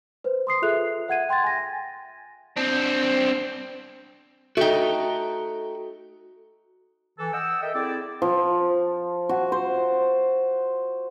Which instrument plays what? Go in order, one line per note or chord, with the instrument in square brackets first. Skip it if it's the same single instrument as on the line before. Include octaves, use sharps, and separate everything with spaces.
[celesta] B4 C5
C6 D#6 C7
F4 G#4 A4 E5 F#6 F7
E5 F#5 G#6 D#7
G5 C6 G#6 A6
G#5 A#6
[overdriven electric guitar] C4 D4
[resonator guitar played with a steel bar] A3 D#4 [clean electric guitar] F#4 G5
[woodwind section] E3 A4
D#5 F#5 G5 E6
A4 A#4 D#5 E5 G5
C4 E4 G#4 A4 D5
[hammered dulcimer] F3
F#4
C5